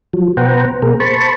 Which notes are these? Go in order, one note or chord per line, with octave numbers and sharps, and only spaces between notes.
F3 F#3
B2 B4 C5 F#5 G5 A#5
B2 A#3 G#4 A#4
C5 A5 B5 C#6